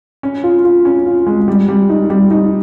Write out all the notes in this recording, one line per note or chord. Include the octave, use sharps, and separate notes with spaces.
C#4
F4
F4
C#4
F4
G#3
G3
G3
D#4
G3
D#4